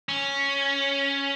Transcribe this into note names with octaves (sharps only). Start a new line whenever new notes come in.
C#4